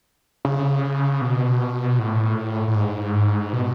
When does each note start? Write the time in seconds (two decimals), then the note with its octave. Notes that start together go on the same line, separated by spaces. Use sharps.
0.45 C#3
1.21 B2
1.99 A2
2.68 A2
2.75 G#2
3.53 B2